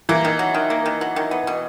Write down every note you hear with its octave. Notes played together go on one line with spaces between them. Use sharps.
E3 A#3
D#3
F#3
D#3
A#3
D#3
F#3
D#3
B3
B2